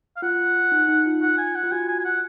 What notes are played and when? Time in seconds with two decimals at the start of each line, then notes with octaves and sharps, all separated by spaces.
0.16 F5
0.22 F4 F#5
0.72 D#4
0.88 D#4
1.06 F4
1.22 F#5
1.38 G#5
1.55 F#5
1.63 F4
1.72 F#4 G#5
1.88 G#5
1.99 G#5
2.05 F#5